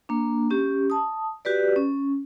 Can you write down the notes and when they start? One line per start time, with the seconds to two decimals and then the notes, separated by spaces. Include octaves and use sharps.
0.09 A#3 D4
0.50 C#4 G4
0.90 A5 D#6
1.45 F#4 G4 B4 D5
1.76 C#4